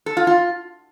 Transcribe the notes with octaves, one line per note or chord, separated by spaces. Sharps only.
A4
F4
F4